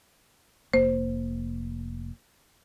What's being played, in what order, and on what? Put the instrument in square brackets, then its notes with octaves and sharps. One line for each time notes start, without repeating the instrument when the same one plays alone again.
[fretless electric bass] F1 A#3 [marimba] C5